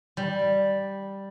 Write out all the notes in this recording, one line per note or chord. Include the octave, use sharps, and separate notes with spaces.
G3